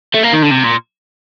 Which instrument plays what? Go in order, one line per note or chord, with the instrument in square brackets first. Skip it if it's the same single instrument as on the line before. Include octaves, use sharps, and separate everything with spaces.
[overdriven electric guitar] A3
A#3
D#3
D3
C3
A#2